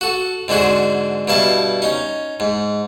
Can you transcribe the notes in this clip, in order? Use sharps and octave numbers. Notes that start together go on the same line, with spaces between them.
F#4 A4
G#2 D3 C4 F#4 G#4
G2 B2 E4 F5 A5
C#4 D#4
G#2